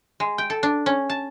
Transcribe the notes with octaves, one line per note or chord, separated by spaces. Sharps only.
G#3
G5
A4
D4
C#4
A5